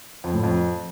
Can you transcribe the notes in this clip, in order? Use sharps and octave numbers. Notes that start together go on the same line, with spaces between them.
F2
A2
F2